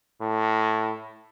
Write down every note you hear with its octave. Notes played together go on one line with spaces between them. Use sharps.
A2